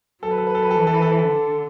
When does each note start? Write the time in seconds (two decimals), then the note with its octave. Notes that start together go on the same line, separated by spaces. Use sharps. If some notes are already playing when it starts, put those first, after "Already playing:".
0.23 F#3 A4
0.31 B4
0.38 A4
0.47 B4
0.55 A4
0.62 B4
0.71 A4
0.75 E3 B4
0.87 A4
0.94 B4
1.02 A4
1.11 B4
1.18 A4
1.27 D3